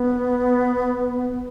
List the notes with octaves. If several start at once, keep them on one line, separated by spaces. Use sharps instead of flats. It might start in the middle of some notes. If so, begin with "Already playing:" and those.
Already playing: B3